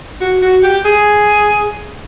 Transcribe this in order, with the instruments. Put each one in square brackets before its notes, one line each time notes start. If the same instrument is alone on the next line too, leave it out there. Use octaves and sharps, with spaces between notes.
[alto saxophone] F#4
F#4
G4
G#4